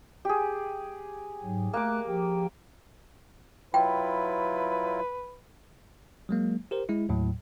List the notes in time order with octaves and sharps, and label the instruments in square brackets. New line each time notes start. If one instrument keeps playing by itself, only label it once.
[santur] G4 G#4
[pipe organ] G#2 F#3
[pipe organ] A3 F#6 [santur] A#3 D6
[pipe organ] F3 G4 G5
[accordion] F#3 E4 F4 [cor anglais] B4 [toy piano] G5
[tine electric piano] F#3 G#3 A#3
G4 A#4 C5
G#3 E4
D#2 A2 F#3